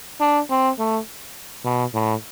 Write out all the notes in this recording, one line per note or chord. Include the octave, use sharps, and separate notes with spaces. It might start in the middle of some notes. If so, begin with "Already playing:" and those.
D4
C4
A3
B2
A2